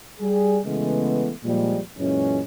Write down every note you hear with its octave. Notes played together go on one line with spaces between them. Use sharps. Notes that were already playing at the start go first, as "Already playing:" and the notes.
G3 G#4
C#3 E3 G#3 A3 B3
A#2 F3 G3 G#3
F#2 A#2 E3 G#3 C#4